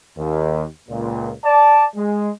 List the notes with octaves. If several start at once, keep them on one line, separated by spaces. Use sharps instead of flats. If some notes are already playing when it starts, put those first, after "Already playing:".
D#2
C#2 A#2
D5 A5
G#3